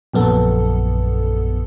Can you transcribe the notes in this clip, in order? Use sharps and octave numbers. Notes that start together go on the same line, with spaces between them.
A#1 F#2 B3 A4